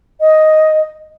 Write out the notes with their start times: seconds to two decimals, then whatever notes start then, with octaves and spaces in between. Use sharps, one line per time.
0.20 D#5